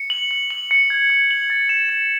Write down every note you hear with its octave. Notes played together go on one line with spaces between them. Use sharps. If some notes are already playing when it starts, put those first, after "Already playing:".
Already playing: C#7
F#7
F#7
F#7
C#7
G#6
G#6
F#7
A6
E7
E7